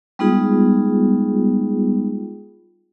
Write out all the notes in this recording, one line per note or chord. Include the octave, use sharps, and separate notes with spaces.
G3 G#3 B3 D#4 F4 G#4